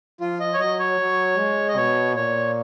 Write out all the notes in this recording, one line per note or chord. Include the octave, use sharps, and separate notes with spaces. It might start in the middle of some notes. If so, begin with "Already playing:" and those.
F3 F4
D#5
C#5
F#3 D#5
C#5
F#3
G#3
D#5
B2 C#5
A#2 C#5